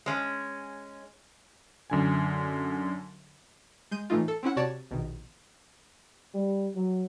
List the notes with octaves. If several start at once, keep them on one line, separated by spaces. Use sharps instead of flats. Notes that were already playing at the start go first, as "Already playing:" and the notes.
G#3 C#4
F#2 D3 G#5
G#3 G6 D#7
A2 E3 A3 D#4 F4
A4
C4 C#4 E4 F#5
C3 F#4 C#5 D5 A5 A6
A#1 B2 D#3
G3
F#3